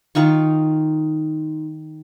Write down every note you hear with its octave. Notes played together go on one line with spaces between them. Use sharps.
D#3 D#4 F4 C#6